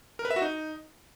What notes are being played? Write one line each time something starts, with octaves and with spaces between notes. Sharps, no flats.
A#4
B4
E5
F#4
D#4